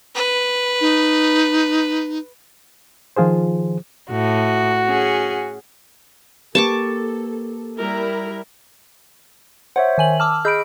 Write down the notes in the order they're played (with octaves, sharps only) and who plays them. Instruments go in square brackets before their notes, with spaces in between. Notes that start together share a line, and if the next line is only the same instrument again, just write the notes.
[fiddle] B4
[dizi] D#4
[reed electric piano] D#3 F3 F4 G#4 C5
[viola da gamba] A2 [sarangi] F#4
[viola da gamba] C#4 G#4
[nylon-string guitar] A#3 G4 B4 [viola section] A4 [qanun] A5 C#6 D6
[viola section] G3 E4 A#4
[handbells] C5 C#5 E5 [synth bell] F#5
[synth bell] D#3 G#5 F#7
[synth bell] A5 D6 E6 [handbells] F6
[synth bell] G#4 E6 G6 [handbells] D#5 B5 D7